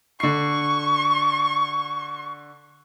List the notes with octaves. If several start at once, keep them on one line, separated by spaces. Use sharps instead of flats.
D3 C#6 C7